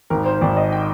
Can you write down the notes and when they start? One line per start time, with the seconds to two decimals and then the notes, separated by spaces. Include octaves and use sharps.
0.10 G#1 A#4
0.26 C5
0.41 G#1 D5
0.57 D#5
0.72 G5